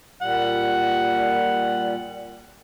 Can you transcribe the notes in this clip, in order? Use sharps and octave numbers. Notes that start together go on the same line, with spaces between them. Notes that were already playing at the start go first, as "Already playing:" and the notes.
A#2 G3 F#5